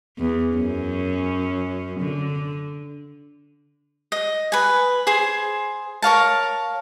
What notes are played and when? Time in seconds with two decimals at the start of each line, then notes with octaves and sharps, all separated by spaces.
0.19 E2
0.53 F#2 C#4
2.00 D3
4.12 D#5
4.52 B4 G#5
5.07 G#4 C5 G#5
6.02 A#4 C#5 F5 A5